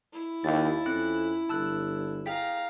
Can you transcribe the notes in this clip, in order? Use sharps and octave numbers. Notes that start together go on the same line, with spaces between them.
E4
D#2 A6
F2 C4 C#4 F#6
G1 A5 E6 F#6
G#4 F5 G5 A#5 B6